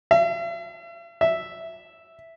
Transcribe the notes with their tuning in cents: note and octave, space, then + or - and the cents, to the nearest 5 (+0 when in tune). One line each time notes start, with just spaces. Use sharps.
E5 +45
E5 +0